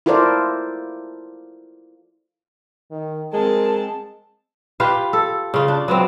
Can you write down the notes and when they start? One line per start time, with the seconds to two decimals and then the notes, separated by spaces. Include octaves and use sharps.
0.06 E4 F4 A4 A#4 C5 D5
2.91 D#3
3.33 G#3 C4 A#4 A5
4.80 F4 G4 B4 F5
5.13 A4
5.54 C#3 F4
5.68 D4
5.88 F#3 B3 C4